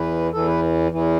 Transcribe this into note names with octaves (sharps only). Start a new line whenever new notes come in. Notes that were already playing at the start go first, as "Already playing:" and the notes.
Already playing: E2 E3 B4
E2 E3 A4
B4
E2 E3